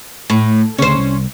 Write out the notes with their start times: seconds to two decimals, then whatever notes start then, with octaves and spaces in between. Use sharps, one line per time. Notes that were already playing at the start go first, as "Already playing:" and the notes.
0.30 A2
0.78 D2 C#3 C#4 C5
0.97 C2